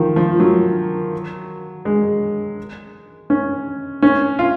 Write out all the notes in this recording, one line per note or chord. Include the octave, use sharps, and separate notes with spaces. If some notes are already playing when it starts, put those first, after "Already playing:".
Already playing: D#3 F3
F3
F#3
G#3
C#4
C#4
F4